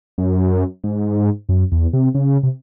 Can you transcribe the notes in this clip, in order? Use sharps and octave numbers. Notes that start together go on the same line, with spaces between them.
F#2
G#2
F#2
E2
C3
C#3
C3